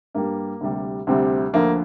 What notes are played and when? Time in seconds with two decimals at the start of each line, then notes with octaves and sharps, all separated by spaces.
0.14 G2 G3 A#3
0.61 D2 C3 G3
1.07 D2 C3 G3 C4
1.53 D2 D3 F3 A#3